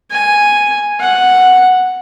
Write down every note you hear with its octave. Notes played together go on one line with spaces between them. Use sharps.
G#5
F#5